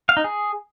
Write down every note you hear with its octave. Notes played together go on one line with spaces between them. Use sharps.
F5
D#4
G#4